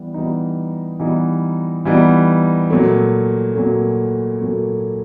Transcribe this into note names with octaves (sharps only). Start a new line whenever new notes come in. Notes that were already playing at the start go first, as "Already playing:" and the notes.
Already playing: E3 G3 B3
E3 G3 B3 D#4
E3 G3 B3 D#4
E3 G3 B3 D#4
A#2 F#3 A3
A#2 F#3 A3
A#2 F#3 A3